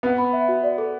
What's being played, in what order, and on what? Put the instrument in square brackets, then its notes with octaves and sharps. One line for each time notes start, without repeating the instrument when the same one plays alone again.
[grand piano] B3 [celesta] B4
[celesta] B5
E5
F#4
D5
A4